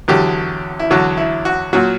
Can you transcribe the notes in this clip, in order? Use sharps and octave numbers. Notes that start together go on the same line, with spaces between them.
E2 D3 F#3 G4
E4
E2 D3 F#3 F#4
E4
F#4
A#2 F#3 F#4